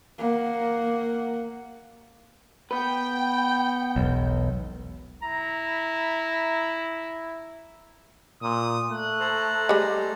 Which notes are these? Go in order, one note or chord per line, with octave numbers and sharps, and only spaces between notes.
A#3 F#5
B3 B4 G5
E1 B1
E4 A#5
A#2 D#6
A3 F#6
A4 C5 A#5
G3 G#3